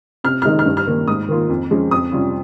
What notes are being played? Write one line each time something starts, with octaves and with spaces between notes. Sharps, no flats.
C3 F6
D#3 G#3 D#4 F6
F6
G2
F6
D#3 A#3
G#2 D#6
D#3 A#3 F4
F2
C#3 F3 G#3 C#4
F2 D#6
C3 G3 C#4 F4